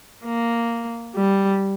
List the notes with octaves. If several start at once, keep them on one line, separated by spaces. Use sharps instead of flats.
A#3
G3